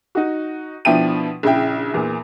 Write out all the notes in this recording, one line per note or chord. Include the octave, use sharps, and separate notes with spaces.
D#4 F#4
B2 F3 D4 E4 G5 D#7
A#1 C#3 E4 G5
E2 A#2